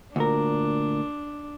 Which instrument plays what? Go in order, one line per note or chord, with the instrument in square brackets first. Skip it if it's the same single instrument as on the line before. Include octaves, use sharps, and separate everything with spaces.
[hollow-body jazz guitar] D2 A#2 A#4 [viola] D4